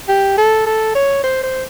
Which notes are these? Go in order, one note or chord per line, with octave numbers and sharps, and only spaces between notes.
G4
A4
A4
C#5
C5
C5